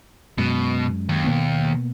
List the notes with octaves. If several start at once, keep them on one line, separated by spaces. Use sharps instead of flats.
F#2 B2 G#3
D#2
B2 A#3 B3